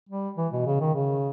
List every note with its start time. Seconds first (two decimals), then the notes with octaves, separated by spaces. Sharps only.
0.09 G3
0.37 E3
0.52 B2
0.66 C#3
0.80 D#3
0.95 C#3